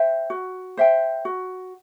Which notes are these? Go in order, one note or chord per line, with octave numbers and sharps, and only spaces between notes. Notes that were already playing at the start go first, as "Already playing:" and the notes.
Already playing: C5 E5 G5
F#4
C5 E5 G5
F#4